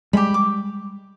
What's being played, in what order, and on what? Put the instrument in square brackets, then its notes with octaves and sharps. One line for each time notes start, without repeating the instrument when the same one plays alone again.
[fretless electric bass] G3 G#3 [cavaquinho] G4 B5
[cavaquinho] D6